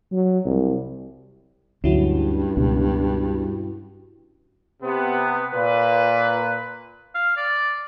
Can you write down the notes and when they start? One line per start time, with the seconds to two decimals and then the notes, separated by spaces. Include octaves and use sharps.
0.12 F#3
0.45 C2
1.84 D2 G2 F#3 C#4 E4 F#4
2.57 C#2 B2
4.83 C3 B3
5.54 A#2 B4
7.15 F5
7.37 D5